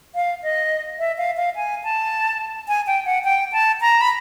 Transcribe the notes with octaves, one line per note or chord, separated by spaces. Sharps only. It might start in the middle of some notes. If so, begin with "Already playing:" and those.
F5
D#5
E5
F5
F5
G#5
A5
G#5
G5
F#5
G5
A5
A#5
B5